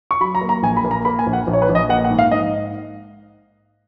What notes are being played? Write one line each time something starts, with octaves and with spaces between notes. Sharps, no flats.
C#6
F#3 B5
A#5
A#3
A#5
A#1 G#5
B5
A#3
A#5
A#3 B5
G#5
A#1
F#5
A#1
C#5
B4
A#1
D#5
A#3 F#5
F#5
G#2
F5
G#2 D#5